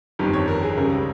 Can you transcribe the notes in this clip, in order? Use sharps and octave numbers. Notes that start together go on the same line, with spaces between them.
G1 F2 D#3 G3
C#5
A#4
G#4
C#2 C#3 G3 A#4